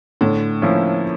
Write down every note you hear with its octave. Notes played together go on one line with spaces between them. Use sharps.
A2 D3
F3 A#3 C#4 E4